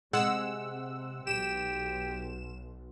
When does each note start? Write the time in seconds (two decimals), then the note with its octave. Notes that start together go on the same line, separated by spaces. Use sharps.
0.13 C3 G#3 F#5 E6
1.27 B1 G4 E7